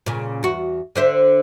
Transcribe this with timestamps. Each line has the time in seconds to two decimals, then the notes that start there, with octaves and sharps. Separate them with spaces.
0.06 A#2 C#3
0.43 E2 F#4
0.95 D3 C5 E5